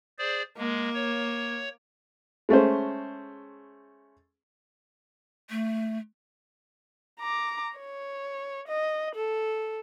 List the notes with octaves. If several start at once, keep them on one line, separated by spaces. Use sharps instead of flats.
G#4 C5 D5
G#3 A#3
C#5
G#3 A3 C#4 C5
A3
A#5 D6
C#5
D#5
A4